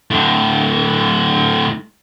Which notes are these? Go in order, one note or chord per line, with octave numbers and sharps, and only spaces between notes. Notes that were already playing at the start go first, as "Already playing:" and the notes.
A2 D3